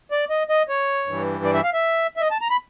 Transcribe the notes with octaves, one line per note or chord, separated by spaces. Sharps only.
D5
D#5
D#5
C#5
G2 E3 G3
D5
E5
F5
E5
E5
D#5
A5
A#5
B5